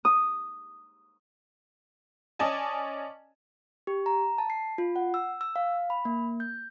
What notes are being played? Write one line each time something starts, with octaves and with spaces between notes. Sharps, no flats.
D#6
C#4 D5 D#5 G#5 A5
G4
A#5
A5
C7
F4
F#5
E6
E6
F5
B5
A#3
G6